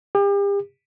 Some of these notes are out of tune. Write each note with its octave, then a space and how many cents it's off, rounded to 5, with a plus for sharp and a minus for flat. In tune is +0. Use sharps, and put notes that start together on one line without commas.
G4 +40